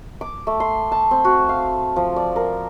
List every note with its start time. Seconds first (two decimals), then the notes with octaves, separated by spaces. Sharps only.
0.21 D6
0.47 A3
0.60 C6
0.92 A5
1.11 C4
1.25 F#4
1.49 F5
1.96 F3
2.16 D5
2.36 A#4